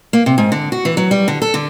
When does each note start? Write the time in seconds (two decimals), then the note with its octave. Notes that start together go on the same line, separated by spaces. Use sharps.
0.13 A#3
0.26 C3
0.38 G#2
0.52 D3
0.72 F#4
0.85 E3
0.97 F#3
1.11 G3
1.28 D3
1.42 A4
1.54 D3